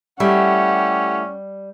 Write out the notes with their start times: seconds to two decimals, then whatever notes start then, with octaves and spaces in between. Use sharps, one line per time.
0.20 G3 A3 C#4 E4 G4 E5 F#5